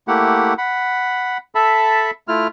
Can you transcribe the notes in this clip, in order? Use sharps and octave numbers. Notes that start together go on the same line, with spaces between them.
A3 A#3 E4 G4 F#5
F#5 B5
A4 E5 A5 B5
A3 E4 F4 F6